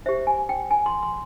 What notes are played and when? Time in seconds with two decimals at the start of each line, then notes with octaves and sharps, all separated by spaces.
0.06 G4 C5 E5
0.27 G#5
0.49 G5
0.71 G#5
0.86 C6
1.03 C6